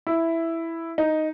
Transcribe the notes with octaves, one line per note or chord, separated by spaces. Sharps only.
E4
D#4